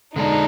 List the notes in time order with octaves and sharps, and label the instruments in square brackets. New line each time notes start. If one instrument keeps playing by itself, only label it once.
[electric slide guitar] D3 G#3 D4 [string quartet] D#4